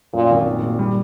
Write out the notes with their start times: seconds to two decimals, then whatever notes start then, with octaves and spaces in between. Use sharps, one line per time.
0.13 F#2 A#2
0.30 G#1
0.47 A#2
0.63 A#2
0.79 G3